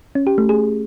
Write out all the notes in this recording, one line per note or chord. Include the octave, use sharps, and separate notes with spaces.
C#4
G4
A3
G#4